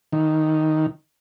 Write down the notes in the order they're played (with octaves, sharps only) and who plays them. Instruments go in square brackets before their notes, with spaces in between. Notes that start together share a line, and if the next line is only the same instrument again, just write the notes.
[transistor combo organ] D#3